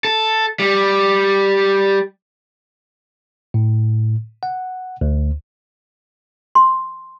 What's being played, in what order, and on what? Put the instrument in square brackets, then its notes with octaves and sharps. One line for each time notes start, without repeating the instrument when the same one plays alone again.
[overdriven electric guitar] A4
G3
[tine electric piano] A2
F#5
D2
[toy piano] C6